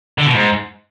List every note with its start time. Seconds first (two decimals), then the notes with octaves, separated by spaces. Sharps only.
0.18 D3
0.26 B2
0.34 G#2